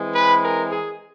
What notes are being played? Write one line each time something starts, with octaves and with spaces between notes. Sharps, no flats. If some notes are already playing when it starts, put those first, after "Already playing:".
Already playing: E3 G#3 C4
B4
A#4
G#4